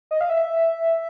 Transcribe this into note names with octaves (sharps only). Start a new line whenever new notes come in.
D#5
F5
E5